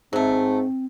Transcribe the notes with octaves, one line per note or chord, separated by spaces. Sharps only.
G#2 F#3 A3 C4